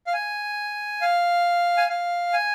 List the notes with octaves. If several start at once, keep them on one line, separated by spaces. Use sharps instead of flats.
F5
G#5
F5
G#5
F5
G#5